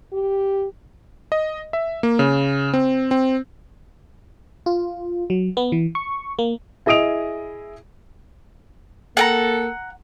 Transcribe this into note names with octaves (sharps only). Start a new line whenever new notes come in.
G4
D#5
E5
A#3
C#3
C4
C4
F4
F#3
B3
E3
C#6
A#3
E4 G#4 D#5 D#6 D7 F7
A#3 A4 F#5 G5 A#5